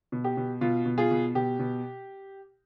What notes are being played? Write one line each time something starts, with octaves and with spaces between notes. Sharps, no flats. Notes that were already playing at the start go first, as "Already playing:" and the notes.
B2
G4
B2
B2 F4
B2
F4 G#4
B2
B2 G4
B2